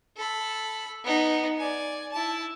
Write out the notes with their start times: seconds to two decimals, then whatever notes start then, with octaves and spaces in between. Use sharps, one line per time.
0.16 A4 B5
1.04 B3 D#4
1.58 D5 G#5
2.12 E4 A5